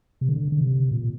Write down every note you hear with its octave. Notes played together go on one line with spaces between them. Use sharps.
C3
D3
D3
C3
A#2